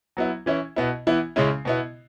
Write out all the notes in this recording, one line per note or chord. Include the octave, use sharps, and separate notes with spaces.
F#3 B3 E4
E3 C#4 E4
B2 B3 E4
E3 B3 E4
C#3 G#3 C#4 E4
B2 B3 E4